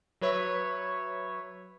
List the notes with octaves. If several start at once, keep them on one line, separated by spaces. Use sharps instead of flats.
F#3 B4 C#5 E5